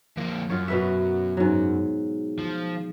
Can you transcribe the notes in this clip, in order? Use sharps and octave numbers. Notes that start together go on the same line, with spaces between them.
F2 A#3
F#2 F4 C#5
B2 B4 E5
G#2 F#3
F3